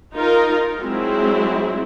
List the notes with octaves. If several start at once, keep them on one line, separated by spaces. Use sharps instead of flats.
D#4 F4 A#4
F#3 G#3 C4 E4